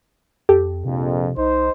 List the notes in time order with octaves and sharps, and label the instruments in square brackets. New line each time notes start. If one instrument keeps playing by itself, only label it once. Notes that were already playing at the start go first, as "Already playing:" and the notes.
[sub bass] F2 [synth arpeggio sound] G4 A4
[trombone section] A#1 F2 [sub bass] C3
[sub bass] B1 [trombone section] D#4 C5